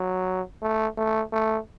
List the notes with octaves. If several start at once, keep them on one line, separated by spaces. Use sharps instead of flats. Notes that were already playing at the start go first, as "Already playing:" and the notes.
Already playing: F#3
A3
A3
A3